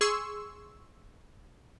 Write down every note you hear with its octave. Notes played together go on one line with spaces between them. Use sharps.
G#4 C6 C#6 E6